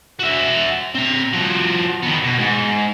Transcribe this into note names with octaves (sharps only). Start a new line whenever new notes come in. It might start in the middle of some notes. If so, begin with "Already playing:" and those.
F#4 E5
C4 A#5
F3 F#4
D#3 B3
B2
G#2